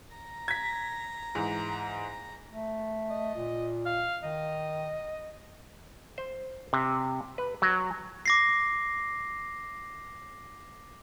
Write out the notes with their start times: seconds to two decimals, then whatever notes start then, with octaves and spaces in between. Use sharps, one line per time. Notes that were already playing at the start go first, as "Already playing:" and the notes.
0.16 A#5
0.48 G#6 B6
1.35 G#2 E3
2.50 A3
3.10 D#5
3.35 A#2
3.86 F5
4.23 D#3 D#5
6.18 C5
6.73 C3
7.38 B4
7.62 F#3
8.26 D6 A#6 C7